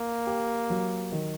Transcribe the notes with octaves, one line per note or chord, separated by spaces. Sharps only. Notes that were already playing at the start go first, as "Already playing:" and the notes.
Already playing: A#3
G4
F#3
D#3